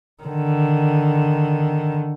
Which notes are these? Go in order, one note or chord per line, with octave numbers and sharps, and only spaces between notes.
D3 D#3